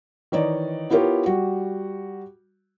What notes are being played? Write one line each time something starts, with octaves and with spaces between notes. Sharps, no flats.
D#3 E3 D#4 C#5 D5
B3 E4 F4 G4 A#4 C#5
G3 F#4